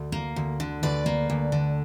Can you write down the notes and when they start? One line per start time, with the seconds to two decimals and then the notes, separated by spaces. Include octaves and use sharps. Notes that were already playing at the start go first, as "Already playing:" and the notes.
Already playing: D2
0.12 A#3
0.36 D2
0.60 D3
0.83 D2 B4 D5
1.06 A#3
1.30 D2
1.52 D3